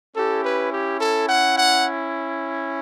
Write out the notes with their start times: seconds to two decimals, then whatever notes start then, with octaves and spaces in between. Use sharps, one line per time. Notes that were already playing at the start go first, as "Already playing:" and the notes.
0.15 C#4 E4 G4 A4
0.43 B4
0.72 G4
1.01 A4
1.28 F#5
1.57 F#5